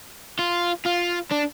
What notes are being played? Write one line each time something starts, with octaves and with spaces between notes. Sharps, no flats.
F4
F4
D4